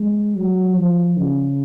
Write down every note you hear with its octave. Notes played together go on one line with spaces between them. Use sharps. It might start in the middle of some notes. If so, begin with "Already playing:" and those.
Already playing: G#3
F#3
F3
C#3